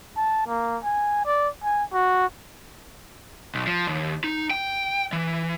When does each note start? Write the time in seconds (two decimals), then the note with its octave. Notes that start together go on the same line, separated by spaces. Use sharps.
0.17 A5
0.47 A#3
0.84 G#5
1.26 D5
1.64 G#5
1.93 F#4
3.55 B1
3.67 F3
3.87 D#2
4.24 D#4
4.51 G5
5.13 E3